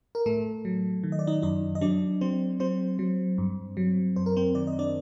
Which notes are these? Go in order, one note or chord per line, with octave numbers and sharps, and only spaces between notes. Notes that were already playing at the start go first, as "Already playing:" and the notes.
A#4
A2 A3 A4
F#3
D#3
D#5
D5
D#4 D#5
F#2 D#4 D#5
D#5
F#3 D4 D5
F#3 C4 C5
F#3 C4 C5
F#3
G2
F#3
F#2 C5
A#4
C4 C5
D#3 D5
D#5
D4 D5